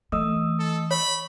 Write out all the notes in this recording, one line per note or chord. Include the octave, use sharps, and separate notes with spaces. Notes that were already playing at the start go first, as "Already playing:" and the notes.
E3 A3 D#5 D#6 E6
A4
C#5 B5